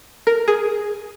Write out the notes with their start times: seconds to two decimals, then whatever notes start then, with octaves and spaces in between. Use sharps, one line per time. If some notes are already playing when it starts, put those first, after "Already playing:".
0.27 A#4
0.48 G#4